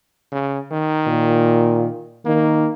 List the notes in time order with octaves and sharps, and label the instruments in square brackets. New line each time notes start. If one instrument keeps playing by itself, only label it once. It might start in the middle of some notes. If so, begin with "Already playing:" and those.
[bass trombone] C#3
D#3
[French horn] A#2
[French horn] D#3 [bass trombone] A#3